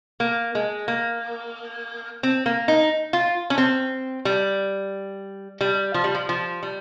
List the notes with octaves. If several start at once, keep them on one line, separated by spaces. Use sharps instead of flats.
A#3
G#3
A#3
C4
A#3
D#4
F4
C#4
C4
G3
G3
F3
G3
F3
F3
G3